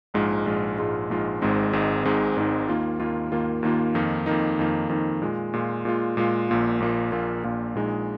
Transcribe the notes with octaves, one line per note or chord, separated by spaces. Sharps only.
A#1 G#2 G#3 F4
A#1 G#2 G#3 F4
A#1 G#2 G#3 F4
A#1 G#2 G#3 F4
G#1 G#2 G#3 C4 D#4
G#1 G#2 G#3 C4 D#4
G#1 G#2 G#3 C4 D#4
G#1 G#2 G#3 C4 D#4
D#2 D#3 A#3 F4
D#2 D#3 A#3 F4
D#2 D#3 A#3 F4
D#2 D#3 A#3 F4
F2 D#3 A#3 D#4
F2 D#3 A#3 D#4
F2 D#3 A#3 D#4
F2 D#3 A#3 D#4
A#2 G#3 F4
A#2 G#3 F4
A#2 G#3 F4
A#2 G#3 F4
A#1 A#2 A#3 F4
A#1 A#2 A#3 F4
A#1 A#2 A#3 F4
A#1 A#2 A#3 F4
A#1 A#2 G#3 D#4